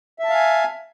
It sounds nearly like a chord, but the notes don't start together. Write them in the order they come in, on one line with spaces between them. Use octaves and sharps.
E5 A5 F5 G#5